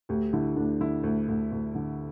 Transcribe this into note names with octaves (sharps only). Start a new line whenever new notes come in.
D2 G4
D3 E4
D2 D4
D3 E4
D2
D2
D2
D3